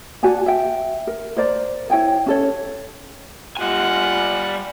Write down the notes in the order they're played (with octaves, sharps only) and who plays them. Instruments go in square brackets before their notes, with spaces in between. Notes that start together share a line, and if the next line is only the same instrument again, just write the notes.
[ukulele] F#4 D5 G#5 A5
E5 G5
A#4
A#4 C5 D5 A#5
E4 C#5 G5 G#5
C#4 A4 C#5
[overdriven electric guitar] G3 G#5 [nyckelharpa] F4 F#5